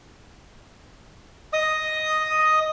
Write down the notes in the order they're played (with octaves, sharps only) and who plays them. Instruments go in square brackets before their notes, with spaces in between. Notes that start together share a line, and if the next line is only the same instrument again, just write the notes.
[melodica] D#5 D#6